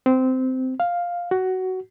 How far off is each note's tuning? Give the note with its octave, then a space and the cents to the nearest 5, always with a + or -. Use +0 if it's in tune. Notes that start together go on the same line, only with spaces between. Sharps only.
C4 -15
F5 +5
F#4 +15